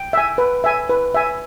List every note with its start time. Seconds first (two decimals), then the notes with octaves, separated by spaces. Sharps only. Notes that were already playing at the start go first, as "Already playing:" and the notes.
Already playing: G5
0.13 E5 G#5
0.38 B4
0.64 E5 G#5
0.89 B4
1.14 E5 G#5